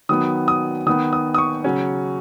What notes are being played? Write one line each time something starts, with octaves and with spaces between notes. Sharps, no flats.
D#3 F#3 B3 D#6
D#6
D#3 B3 D#6
D#6
D#6
C#6
C#3 F#3 C#4